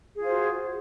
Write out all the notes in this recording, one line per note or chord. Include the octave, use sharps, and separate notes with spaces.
F4 F#4 G#4 C5